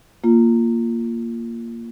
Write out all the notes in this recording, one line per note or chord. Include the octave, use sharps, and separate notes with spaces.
A#3 F4